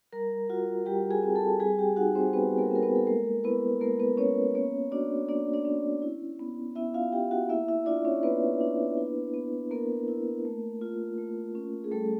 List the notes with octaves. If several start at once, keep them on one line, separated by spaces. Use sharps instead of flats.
G3 A#4 A#5
F4 F#4 F#5
G3 G4 G5
G#4 G#5
C4
A4 A5
G3 G#4 G#5
G4 G5
D#4 F#4 F#5
C4 C5
G3 B3 B4
A#3 A#4
C4 A#4
B3 B4
A4
G#3 A#3 A#4
B3 E4 B4
G#3 A#3 A#4
B3 B4
B3 C#4 C#5
A#3 C#4 C#5
D4 F#4 D5
A#3 D4 D5
D4 D5
C#4
E4
B3
B3 E4 E5
F4 F5
E4 G4 G5
F#4 F#5
A#3 E4 E5
E4 E5
D4 F4 D5
C#4 C#5
A#3 B3 B4
D4
E4
B3
A#3 B3 A#4
E4
A3
F4
A3
C#4
G#4
G3 A3 A4